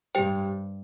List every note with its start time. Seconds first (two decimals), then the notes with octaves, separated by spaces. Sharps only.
0.15 G2 G4 C5 G5